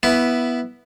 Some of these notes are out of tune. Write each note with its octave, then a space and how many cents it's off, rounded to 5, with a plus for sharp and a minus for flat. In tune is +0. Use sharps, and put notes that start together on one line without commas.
B3 -5 E4 +0